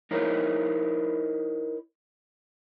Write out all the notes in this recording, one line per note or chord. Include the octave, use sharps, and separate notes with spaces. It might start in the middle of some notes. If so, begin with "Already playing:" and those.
D#4 E4 A#4 C5 C#5